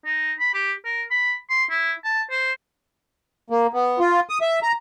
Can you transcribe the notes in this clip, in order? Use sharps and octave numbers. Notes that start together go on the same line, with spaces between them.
D#4
B5
G4
A#4
B5
C6
E4
A5
C5
A#3
B3
F4
D#6
E5
A#5